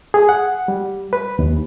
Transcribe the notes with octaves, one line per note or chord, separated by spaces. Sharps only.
G#4
F#5
G3
B4
D#2